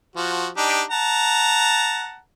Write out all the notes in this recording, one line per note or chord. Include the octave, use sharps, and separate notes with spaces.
F3 F#4
D4 D#4 G4
F#5 A5 A#5